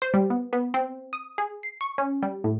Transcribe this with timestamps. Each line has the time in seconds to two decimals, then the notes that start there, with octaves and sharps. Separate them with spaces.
0.02 C5
0.14 G3
0.30 B3
0.53 B3
0.74 C4
1.13 D#6
1.38 G#4
1.63 C7
1.81 C#6
1.98 C#4
2.23 G3
2.44 A2